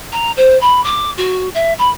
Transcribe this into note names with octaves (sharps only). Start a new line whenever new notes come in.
A#5
C5
B5
D6
F#4
E5
B5